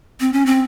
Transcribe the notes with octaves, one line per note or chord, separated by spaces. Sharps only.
C4
C#4
C4